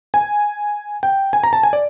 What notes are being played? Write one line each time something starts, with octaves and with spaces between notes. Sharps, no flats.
G#5
G5
G#5
A#5
A5
G#5
D5